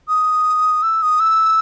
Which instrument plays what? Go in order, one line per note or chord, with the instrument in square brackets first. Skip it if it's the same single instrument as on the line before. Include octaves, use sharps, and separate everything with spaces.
[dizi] D#6
E6
D#6
E6